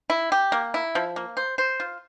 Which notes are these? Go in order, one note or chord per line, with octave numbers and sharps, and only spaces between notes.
E4
G4
A#3
E4
F3
A#3
C5
C5
F4